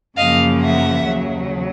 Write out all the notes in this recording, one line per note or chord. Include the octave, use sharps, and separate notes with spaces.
F#2 C#3 F3 A#3 D#5 F5
E5 F#5
D#2 C#3 F#3